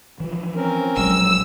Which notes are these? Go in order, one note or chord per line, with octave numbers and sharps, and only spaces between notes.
E3 F3
C4 C#4 A#4
A#1 F#3 G#3 E6